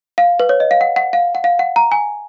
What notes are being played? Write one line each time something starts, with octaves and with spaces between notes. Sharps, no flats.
F5
B4
C#5
D#5
F5
F#5
F#5
F5
F#5
F5
F#5
A#5
G#5